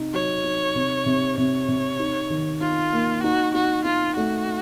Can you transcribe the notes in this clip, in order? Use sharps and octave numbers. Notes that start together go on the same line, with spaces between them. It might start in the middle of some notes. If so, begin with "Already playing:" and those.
Already playing: C3 D#4
F#3 C#5
D#4
C3
C3
C3 C#5
C3
D#4
D#3
D#4 F4
A#3
D#4 F#4
D#4 F#4
D#4 F4
A3 F#4